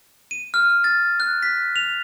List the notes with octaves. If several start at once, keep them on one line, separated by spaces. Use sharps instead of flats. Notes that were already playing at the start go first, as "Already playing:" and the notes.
D#7
F6
A6
F#6
B6
F7